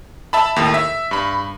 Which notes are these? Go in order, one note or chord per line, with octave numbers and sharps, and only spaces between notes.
E5 A5 B5
D#2 A2
E5
G2 B5